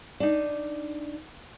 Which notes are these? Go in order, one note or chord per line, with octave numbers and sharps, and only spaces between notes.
D4 D#4